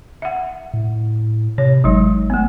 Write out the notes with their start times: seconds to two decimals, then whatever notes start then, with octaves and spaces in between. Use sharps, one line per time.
0.22 E5 F#5
0.74 A2
1.58 C3 C#5
1.84 G#1 F#3 G#3 D#4
2.30 A3 B3